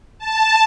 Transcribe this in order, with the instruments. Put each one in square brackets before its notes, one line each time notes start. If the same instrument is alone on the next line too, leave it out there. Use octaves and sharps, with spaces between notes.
[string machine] A5